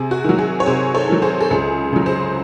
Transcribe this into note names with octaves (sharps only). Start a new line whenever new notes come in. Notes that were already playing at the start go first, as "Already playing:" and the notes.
Already playing: C3 G#4
F#4
D#3 F#3
G#4
C#5
C3 G#4 C5
A4 C#5
D#3 F#3
G#4 C5
A4
C#2 G#4
C#3 F#3
G#4 C5